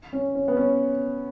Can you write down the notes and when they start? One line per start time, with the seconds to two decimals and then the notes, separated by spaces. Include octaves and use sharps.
0.13 C#4
0.35 C#4
0.48 B3
0.57 C#4